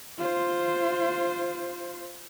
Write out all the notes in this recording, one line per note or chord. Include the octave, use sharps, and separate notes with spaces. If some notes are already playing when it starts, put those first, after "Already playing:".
F4 C5